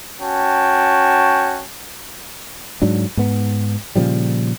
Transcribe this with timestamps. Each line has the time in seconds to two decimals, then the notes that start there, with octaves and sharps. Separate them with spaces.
0.20 C#4 F#4 G5 A5
2.82 G#2 F#3 D4
3.17 G#2 B3
3.96 A#2 C#3 F3 G3